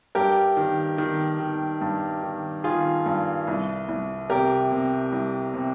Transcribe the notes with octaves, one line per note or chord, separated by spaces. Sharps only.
G2 G4 A#4
D#3
D#3
D#3
G2
D#3
D#3 F4 G#4
G2
C2
C2
C3 G4 A#4
C3
C2
C3